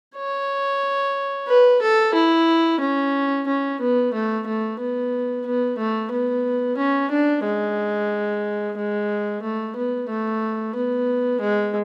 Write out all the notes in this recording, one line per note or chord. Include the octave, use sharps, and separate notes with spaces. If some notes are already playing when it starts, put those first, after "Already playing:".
C#5
B4
A4
E4
C#4
C#4
B3
A3
A3
B3
B3
A3
B3
C#4
D4
G#3
G#3
A3
B3
A3
B3
G#3